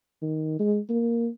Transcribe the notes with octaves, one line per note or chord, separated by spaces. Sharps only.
D#3
G#3
A#3